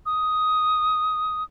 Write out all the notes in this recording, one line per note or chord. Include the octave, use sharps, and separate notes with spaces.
D#6